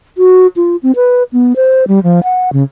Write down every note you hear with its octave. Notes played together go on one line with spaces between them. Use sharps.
F#4
F4
C4
B4
B3
C5
G3
F3
F#5
C#3